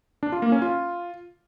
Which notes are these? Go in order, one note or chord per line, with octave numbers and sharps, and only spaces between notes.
D4
F4
A#3
C#4
F4